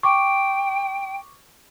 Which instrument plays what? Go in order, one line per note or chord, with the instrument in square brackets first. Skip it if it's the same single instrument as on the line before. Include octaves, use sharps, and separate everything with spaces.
[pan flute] G5 [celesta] C#6 D6